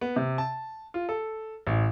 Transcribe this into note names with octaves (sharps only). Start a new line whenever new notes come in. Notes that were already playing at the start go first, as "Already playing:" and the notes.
B3
C3
A5
F4
A4
A1